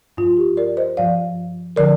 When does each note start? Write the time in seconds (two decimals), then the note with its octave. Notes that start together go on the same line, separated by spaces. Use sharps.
0.17 G2 F3 F4
0.37 G4
0.57 A#4 D5
0.77 C5 D#5
0.97 G2 F3 D5 F5
1.76 D3 F3 A#4 D5